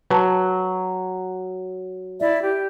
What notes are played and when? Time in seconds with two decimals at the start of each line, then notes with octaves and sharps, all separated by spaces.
0.10 F#3 B4 A5
2.20 E4 D5 E5
2.40 G4